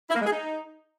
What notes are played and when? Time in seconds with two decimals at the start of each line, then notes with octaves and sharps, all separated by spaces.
0.10 E4
0.15 A#3
0.21 G#3
0.26 G#4
0.32 D#4